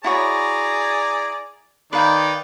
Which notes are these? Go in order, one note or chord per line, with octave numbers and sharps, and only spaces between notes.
E4 F#4 G#4 C#5 D5 A#5
D#3 D#4 B4 D5 F5 G5